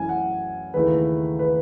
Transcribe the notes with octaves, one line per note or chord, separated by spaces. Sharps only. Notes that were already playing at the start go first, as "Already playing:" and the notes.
Already playing: F#2 E3 A3 C#4 E4 G#5
F#5
D#2 C#3 E3 A3 E4 B4
B4